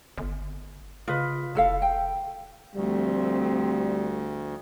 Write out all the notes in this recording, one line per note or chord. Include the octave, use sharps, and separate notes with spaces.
G1
C#3 F4 B4 D#5
F1 E4 A4 F5
G5
D2 F3 G3 A3 C4